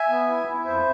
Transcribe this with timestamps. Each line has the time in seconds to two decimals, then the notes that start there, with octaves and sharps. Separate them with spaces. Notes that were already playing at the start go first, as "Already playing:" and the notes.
Already playing: E5 G#5
0.09 B3
0.28 E4
0.47 E4
0.65 F2 C5 E5